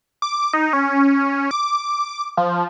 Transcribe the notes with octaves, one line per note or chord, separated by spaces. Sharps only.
D6
D#4
C#4
D6
F3